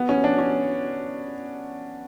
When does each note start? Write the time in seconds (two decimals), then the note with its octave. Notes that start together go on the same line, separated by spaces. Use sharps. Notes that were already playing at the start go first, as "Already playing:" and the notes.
Already playing: B3
0.09 C#4
0.24 D4
0.39 C#4